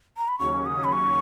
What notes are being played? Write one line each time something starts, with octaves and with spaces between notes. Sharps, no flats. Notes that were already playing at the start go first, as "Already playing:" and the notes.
A#5
B5
D#2 C#3 F#3 C#4 C#6
D#6
B5
C#6